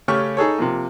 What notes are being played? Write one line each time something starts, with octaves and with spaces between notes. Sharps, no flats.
C#3 A3 C#4 G4 C#6 F6
D#4 G#4 A4 C#5
C3 F3 A#3